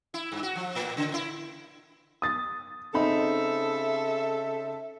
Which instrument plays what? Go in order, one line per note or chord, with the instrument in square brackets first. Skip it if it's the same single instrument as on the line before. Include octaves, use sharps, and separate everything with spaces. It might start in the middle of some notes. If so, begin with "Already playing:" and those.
[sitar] E4
G2
F#4
F3
A2
C#3
E4
[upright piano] D#6 A6
[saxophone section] C#3 A4 E5 [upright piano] C4 D#4 B5